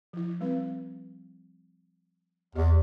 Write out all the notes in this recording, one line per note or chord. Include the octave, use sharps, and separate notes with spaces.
F3 E4
G3 C4 B4
E2 G4 D#5